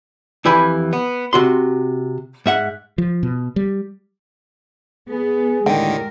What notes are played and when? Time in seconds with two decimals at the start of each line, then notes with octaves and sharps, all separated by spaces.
0.45 F2 E3 G4 G#5 B5
0.93 B3
1.33 C3 F#4 C6
2.46 G#2 E5 F#5
2.98 F3
3.23 B2
3.56 G3
5.09 B3 G#4
5.66 D#2 A2 D3 D#3 G#3 A#4 G5